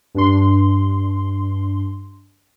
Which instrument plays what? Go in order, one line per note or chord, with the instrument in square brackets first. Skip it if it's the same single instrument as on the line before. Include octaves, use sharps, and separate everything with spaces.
[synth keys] G2 D4 C6